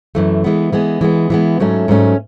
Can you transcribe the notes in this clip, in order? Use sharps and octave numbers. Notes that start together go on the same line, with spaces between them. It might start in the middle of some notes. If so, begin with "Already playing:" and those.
F#2 E3 A3
E3 G#3 B3
E3 G#3 B3
E3 G#3 B3
E3 G#3 B3
G#2 F#3 A3 C#4
G#2 F#3 A3 C#4